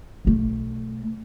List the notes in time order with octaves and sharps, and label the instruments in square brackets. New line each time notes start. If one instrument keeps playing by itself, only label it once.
[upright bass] B1 A3